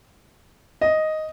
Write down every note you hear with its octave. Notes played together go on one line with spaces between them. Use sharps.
D#5